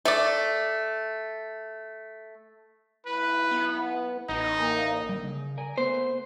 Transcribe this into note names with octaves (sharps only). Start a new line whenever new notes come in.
A3 D5
B1 E4 B4
B3
A1 B2 D#4
A#3
D3 G3
C#3
A#4 D5 G#5
A3 B3 C5